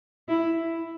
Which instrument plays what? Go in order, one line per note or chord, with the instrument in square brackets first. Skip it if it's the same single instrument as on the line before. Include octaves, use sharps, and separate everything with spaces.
[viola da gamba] E4